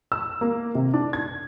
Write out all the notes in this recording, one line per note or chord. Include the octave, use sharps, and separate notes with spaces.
E6
A#3
C3
D4
G#6